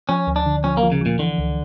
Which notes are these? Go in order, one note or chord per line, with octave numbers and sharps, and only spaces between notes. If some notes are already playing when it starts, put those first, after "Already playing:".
F3 C#4
D2
D4
D3
F3 C#4
A#3
F3
C#3
A#2 F3
D3 E3
C#2